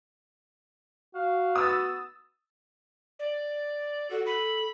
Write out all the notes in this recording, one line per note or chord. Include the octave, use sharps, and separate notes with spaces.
F#4 F5
B3 D#6 E6 A6
D5
F#4 A4
B5